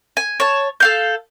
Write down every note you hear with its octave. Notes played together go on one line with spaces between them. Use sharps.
G#5
C#5 A5
A4 F5 G6